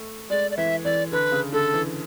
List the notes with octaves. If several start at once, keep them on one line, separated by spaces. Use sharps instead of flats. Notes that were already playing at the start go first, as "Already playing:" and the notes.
Already playing: A3
G#3 D5
D5
E3 E5
E3 D5
D3 B4
C#3
D3 A4
E3